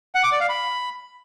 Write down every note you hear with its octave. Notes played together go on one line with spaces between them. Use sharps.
F#5
D6
D5
F5
B5